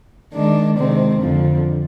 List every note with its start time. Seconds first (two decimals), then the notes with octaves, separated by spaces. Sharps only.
0.33 D#3 G#3 D4
0.77 C3 D#3 G#3 C4
1.21 F2 D3 F3